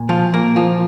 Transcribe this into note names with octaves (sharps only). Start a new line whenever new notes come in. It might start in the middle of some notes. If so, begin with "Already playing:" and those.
Already playing: A#2
F3 F4
A#2 A#3 A#4
F3 F4